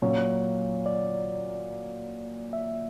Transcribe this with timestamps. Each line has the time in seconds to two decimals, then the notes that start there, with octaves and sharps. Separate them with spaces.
0.02 A#2 F#3 A#3 C#5
0.86 D5
2.53 E5